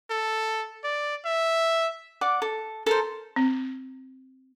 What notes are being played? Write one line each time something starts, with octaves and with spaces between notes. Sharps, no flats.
A4
D5
E5
D5 F#5 D6
A4
A4 A#4 C5
C4